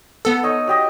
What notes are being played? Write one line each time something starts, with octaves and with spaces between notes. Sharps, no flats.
B3 A4
D#4 C#5 D#5
F#3 G4 D#5